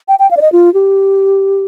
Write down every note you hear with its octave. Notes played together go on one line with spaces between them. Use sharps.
G5
G5
F5
D5
D#5
F4
G4